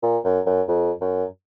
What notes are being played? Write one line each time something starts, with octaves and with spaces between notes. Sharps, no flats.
A#2
F#2
F#2
F2
F#2